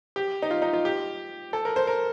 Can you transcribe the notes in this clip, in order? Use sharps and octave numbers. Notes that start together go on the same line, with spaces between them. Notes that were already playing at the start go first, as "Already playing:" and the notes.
G4
D#4
F4
D#4
F4
G4
A4
A#4
C5
A#4